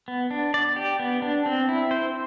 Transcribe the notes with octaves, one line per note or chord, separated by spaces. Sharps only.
B3
D4
D5
G4
B3
D4
C4
E4
C5